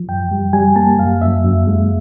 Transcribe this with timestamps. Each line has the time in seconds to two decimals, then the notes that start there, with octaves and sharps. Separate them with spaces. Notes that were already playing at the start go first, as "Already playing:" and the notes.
Already playing: F3
0.08 F#2 G5
0.31 G3
0.53 G3 G#5
0.76 A#3 A5
0.99 F#2 F5
1.22 F#2 E5
1.45 F#2
1.67 G#3